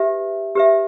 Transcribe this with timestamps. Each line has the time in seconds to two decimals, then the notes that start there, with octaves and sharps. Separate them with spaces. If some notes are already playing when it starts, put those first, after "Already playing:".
Already playing: G4 B4 E5
0.55 G4 B4 E5